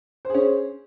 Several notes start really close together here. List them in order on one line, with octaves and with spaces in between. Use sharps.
C5 G#4 C#4